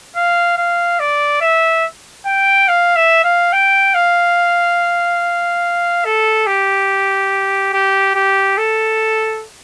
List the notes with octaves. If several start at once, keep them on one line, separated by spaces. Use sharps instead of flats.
F5
F5
D5
E5
G5
F5
E5
F5
G5
F5
A4
G4
G4
G4
A4